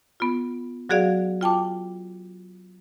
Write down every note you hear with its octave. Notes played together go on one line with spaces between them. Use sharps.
B3 F4
F#3 F#4 G#4 D5 F5
F4 G5 A5 D6